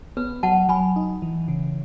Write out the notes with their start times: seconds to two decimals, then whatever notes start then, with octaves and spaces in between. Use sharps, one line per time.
0.17 B3 B4
0.43 F#3 F#5 A5
0.69 F#3 G#5 B5
0.96 D#4
1.22 E3
1.48 C#3